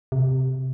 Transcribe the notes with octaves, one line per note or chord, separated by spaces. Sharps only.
C3